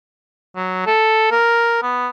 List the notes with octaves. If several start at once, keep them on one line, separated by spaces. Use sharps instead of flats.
F#3
A4
A#4
B3